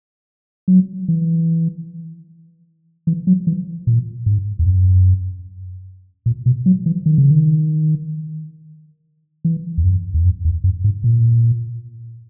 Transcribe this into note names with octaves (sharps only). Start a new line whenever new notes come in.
F#3
E3
E3
F#3
E3
A#2
G#2
E2
F#2
A#2
B2
F#3
E3
D#3
C#3
D#3
E3
E2
F#2
E2
F#2
E2
F#2
G#2
A#2